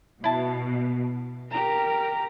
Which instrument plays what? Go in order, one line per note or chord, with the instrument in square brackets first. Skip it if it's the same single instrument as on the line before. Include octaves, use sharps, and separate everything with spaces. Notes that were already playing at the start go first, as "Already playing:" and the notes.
[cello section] B2 [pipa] E4 A5
[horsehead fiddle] G4 A#5 [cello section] A#4